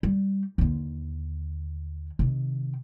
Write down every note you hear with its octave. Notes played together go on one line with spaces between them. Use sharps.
G3
D#2 D3
C3 D#3